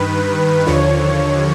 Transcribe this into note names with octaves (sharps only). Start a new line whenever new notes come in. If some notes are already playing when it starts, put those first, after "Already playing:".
Already playing: G2 D#3 B4
D#2 D3 F3 C#5